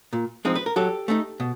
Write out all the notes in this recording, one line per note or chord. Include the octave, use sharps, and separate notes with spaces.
A#2
F3 G#3 C4 D#4
B4
A#4
F#3 G4 A4
A3 C4 D#4
B2